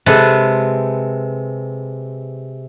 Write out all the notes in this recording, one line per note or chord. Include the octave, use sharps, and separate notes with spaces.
C3 G#3 A4 B4